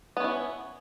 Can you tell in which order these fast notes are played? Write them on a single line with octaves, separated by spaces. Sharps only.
B3 C#4 E4